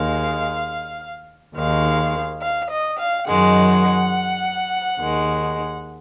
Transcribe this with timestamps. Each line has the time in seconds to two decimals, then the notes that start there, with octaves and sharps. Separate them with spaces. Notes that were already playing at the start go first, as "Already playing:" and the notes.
Already playing: D#2 D#3 G#3 F5
1.55 D#2 D#3 G#3 F5
2.41 F5
2.70 D#5
2.98 F5
3.27 F#2 D#3 G#3 F#5
4.99 D#2 D#3 G#3